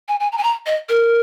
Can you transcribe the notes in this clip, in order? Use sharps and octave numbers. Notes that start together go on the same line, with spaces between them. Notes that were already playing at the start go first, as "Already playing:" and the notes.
G#5
G#5
A#5
G#5
A#5
D#5
A#4